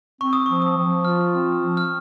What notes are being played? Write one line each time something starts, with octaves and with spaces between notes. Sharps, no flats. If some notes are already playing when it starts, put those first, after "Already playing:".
C4 C#6
D#6
F3 C#6
D#6
F3
F4 F6
C4
F3
F6